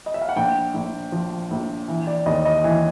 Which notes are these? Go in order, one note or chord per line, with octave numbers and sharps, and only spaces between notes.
D#5
E5
F5
F#5
A#1 G5
A#1
F3
A#1
E3
D5
D#2 D#5
D#5
E3